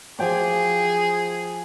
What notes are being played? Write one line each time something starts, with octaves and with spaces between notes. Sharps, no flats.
F3 G#4 G5 D6